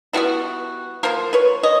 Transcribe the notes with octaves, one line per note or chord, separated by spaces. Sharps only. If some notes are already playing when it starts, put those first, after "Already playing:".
D3 G3 B3 E4 F#4
F3 A#3 A#4 C5
B4 C#5
C#5 D#5